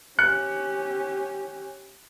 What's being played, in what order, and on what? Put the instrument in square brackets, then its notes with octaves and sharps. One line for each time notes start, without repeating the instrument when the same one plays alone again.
[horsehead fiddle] C#4 G4 [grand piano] F#6 C#7